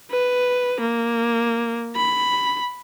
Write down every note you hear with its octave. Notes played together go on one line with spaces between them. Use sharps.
B4
A#3
B5